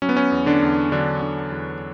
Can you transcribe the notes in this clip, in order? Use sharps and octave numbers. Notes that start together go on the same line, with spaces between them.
F#3 C#4
B3
C#4
E2
D3 D4
E2
D3 F#3 D4
D3
E2